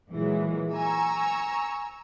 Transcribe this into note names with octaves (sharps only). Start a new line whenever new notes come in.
A#2 E3 F#3 G#3
G#5 A#5 C#6 E6